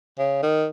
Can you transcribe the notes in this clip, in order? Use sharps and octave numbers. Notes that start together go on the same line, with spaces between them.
C#3
D#3